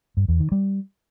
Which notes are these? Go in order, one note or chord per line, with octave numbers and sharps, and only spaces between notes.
G2
E2
D#3
G3